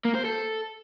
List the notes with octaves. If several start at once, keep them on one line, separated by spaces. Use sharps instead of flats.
A#3
C5
A4